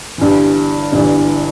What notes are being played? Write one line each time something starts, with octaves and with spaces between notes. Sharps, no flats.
G1 G2 E3
G1 G2 E3